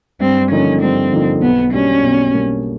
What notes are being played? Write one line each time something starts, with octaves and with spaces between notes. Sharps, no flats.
G2 C4
D3 F3 A#3 C#4 D#4
G2 C4
D3 F3 A#3 D#4
B1 B3
B2 G3 A#3 C#4 D4
B1
B2 G3 A#3 D4